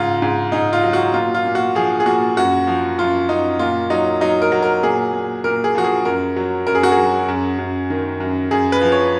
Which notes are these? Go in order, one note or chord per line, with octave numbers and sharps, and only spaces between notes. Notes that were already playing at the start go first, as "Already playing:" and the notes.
Already playing: G#2 C#3 F4
G#2
G#2 D#4
F4
F#3
F#4
A#2 F4
F4
A#2
F#4
F3 G#4
G#4
A#2 F#4
F#2 F#4
F3
F#2 F4
F#2 D#4
A#2 F4
F#3 D#4
F#3 D#4
A#4
F#3
A#4
A#2 G#4
A#2
A#2 A#4
G#4
F3 F#4
G#4
F#2 A#4
F#3
F#2 A#4
G#4
F#4
G#4
F#3
F#2
F#2
D#3
F#2
F#2 G#4
B4
F3
C#5